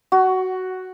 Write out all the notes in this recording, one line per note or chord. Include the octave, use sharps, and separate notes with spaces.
F#4